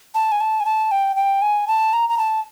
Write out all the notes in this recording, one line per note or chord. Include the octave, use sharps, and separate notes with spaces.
A5
G#5
A5
G#5
A5
G5
G5
G#5
A5
A#5
A#5
A5